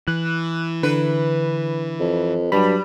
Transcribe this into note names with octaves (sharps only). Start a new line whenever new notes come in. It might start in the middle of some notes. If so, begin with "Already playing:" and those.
E3 F#6
D3 B4
F2
G2 F#3 G3 B5